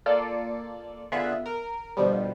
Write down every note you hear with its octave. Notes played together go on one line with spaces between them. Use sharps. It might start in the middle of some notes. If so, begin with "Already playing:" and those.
A#3 F4 A4 D5
D3 B3 F4 G#4 E5 F#6
A#4
B2 D3 F3 G3